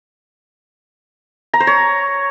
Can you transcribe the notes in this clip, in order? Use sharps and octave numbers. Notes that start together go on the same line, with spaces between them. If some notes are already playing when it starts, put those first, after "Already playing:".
A#5
C5
C#5